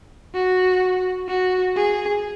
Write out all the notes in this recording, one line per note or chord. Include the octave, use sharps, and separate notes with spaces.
F#4
F#4
G#4